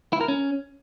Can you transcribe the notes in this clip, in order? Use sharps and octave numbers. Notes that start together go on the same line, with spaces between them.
E4
A#4
C#4